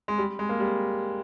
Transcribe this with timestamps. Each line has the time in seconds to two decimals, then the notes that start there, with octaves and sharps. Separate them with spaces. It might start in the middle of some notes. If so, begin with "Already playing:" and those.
0.08 G#3
0.18 G3
0.39 G#3
0.49 A#3
0.60 G3